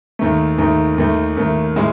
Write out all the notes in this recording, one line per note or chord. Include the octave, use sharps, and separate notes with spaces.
D#2 D#3 A3
D#2 D#3 A3
D#2 D#3 A3
D#2 D#3 A3
A2 G#3 C#4